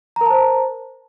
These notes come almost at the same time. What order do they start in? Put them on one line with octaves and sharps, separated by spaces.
A#5 A#4 A5 C5